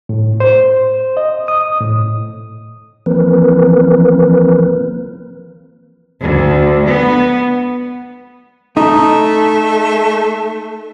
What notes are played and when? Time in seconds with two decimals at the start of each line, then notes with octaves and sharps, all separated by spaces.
0.09 A2
0.40 C5
1.17 D#5
1.48 D#6
1.81 A2
3.06 E3 F3 A#3 C4 A#4 B4
6.23 D2
6.86 B3
8.77 A3 D#4